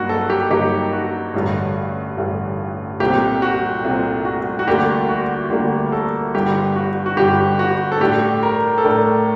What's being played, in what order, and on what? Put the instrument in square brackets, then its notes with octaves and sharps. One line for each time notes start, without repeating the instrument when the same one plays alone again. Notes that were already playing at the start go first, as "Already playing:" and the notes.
Already playing: [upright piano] G2 F#3 A#3 D#4 [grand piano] F#4
[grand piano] A4
G4
[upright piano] G2 F#3 A#3 D#4 [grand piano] G4
[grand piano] F#4
[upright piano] A1 G2 D3
A1 G2 D3
[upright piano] C2 A#2 A3 C4 [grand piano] G4
[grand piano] F#4
[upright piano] C2 A#2 A3 C4
[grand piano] F#4
F#4
[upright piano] D2 D3 G3 A#3 D4 [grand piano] G4
[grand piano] F#4
[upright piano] D2 D3 G3 A#3 D4 [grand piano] G4
[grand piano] A#4
A4
[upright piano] G1 G2 D3 G3 [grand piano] G4
[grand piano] F#4
F#4
[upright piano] G1 G2 D3 G3 [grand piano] G4
[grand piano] F#4
A4
[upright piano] A2 A3 D4 [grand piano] G4
[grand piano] A#4
A4
[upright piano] A2 A3 D4 [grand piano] A#4